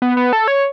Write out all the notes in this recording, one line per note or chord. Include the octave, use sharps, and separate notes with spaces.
B3
B3
A4
C#5